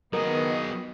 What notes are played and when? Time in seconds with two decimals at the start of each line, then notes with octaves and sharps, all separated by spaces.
0.13 D#3 F#3 B3 G#4 A#4 D#5